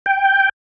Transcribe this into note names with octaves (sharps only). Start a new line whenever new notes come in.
G5